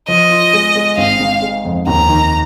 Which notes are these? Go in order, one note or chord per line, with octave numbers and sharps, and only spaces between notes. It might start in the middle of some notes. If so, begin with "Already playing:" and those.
F3 D#5
F4
G#3
G#3
G#1 F5
G#2
G#3
F2
D#2 A#5
D#3